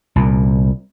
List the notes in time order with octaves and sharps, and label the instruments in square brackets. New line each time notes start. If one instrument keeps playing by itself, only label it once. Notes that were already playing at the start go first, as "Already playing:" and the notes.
[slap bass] C2 A#2